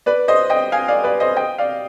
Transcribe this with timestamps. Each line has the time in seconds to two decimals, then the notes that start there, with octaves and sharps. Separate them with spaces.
0.06 B4 D5
0.28 C5 D#5
0.50 D#5 G5
0.72 F5 G#5
0.88 D5 F5
1.04 B4 D5
1.20 C5 D#5
1.36 D#5 G5
1.58 D5 F5